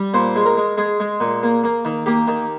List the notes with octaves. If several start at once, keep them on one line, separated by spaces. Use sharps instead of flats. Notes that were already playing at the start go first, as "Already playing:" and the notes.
Already playing: G3
A#2 C5
G#3
A#4
G#3
G#3 G#4
G#3
A#2
A#3
A#3
D#3
A#3 G4
D#3